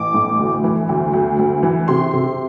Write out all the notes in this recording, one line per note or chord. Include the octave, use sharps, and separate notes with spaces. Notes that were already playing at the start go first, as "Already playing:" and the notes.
Already playing: A1 D6
A2
D2
E3
D2
D2
D2
E3
C3 C6
C3